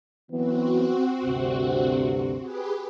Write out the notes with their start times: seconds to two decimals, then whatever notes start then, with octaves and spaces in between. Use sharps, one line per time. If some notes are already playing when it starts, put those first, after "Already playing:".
0.32 E3 F#3 B3 C4 F#4
1.25 D2 G2 C3
2.40 G4 G#4 B4